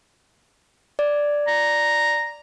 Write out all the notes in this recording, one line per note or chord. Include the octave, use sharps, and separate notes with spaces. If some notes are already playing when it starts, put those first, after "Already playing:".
D5
A#5